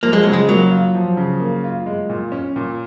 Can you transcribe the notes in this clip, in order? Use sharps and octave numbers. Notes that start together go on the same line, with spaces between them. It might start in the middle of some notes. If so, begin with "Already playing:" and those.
F3 A#3
G#3
C#3 F#3
G#3
F#3 A#3
F4
F3
C#3
A#3
F4
G#3
A#2
C#4
A#2